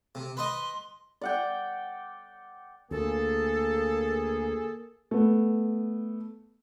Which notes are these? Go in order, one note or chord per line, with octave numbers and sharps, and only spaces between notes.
C3
B4 D#5 C6
D5 F#5 G5
D2 A#3 G#4 A4
A3 B3